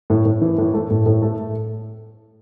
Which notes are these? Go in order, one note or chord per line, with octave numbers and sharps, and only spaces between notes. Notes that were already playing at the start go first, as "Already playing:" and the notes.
A2
A2
E3
A2
A3
A2
A2
A3